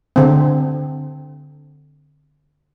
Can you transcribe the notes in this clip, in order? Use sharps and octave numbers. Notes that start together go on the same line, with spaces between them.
D3 C4